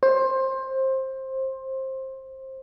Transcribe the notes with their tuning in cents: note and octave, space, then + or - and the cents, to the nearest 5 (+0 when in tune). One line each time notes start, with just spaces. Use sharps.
C5 +20